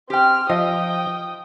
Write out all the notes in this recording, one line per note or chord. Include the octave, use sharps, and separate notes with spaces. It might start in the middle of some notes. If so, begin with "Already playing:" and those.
C4 G4 G5 F6
F3 D#5 E5 G5 D#6